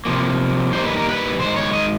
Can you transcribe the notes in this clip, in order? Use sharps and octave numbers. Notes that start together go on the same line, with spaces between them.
C3 F3 A#3
D#3 G3 A#3 C5
B4
A#4
B4
D#3 G#3 C5
C#5
D#5